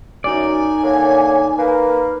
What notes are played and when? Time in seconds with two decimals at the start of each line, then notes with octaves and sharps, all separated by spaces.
0.24 F#2 D#4 D5 G#5
0.83 D3 A#3 C#5
1.58 A#3 A#4 B4